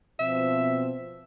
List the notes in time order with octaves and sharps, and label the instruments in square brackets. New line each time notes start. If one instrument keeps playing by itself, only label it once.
[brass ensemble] B2 F3 C4 [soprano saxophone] E5